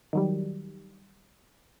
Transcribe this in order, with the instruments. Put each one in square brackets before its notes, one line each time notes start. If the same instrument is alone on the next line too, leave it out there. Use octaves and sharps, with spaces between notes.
[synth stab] D#3 F#3 G3